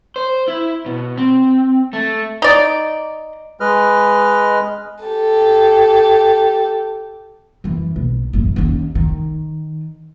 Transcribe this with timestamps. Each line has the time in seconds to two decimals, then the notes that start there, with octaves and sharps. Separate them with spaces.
0.16 C5
0.48 E4
0.86 B2
1.18 C4
1.93 A3
2.42 D#4 D5
3.60 G#3 B4 D#5 F6
5.04 G4 A4
7.64 F#2 E3
7.96 B1
8.33 A1 F#2
8.56 D#2 C#4
8.95 D#3